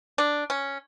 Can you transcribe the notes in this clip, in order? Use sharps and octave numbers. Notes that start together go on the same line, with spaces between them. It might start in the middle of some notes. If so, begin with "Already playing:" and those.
D4
C#4